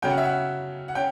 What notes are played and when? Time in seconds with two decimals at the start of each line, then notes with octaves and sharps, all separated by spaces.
0.02 C#3 F#3 C#4 G5
0.10 F#5
0.18 E5
0.25 F#5
0.88 F#5
0.95 C#4 G5